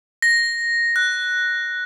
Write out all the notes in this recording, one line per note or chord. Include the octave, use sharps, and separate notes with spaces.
A#6
F#6